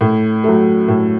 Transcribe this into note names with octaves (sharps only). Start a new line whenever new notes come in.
A2
F#3 A3
A2